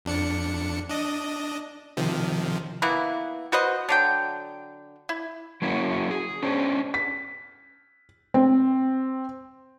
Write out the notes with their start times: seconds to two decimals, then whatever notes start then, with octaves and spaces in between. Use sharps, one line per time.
0.05 F2 D4 C#7
0.89 D4 D#5
1.97 C3 D#3 F3
2.82 E3 A#3 B3 E4
3.52 F#4 B4 C5 D#5
3.89 D3 F#3 G5
5.09 E4
5.62 F#3 A#3 C#4 E4 F#4
6.11 G#4
6.42 C#4 D4 C5
6.94 B6
8.34 C4